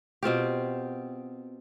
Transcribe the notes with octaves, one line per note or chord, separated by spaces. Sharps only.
B2 C4 F4 G4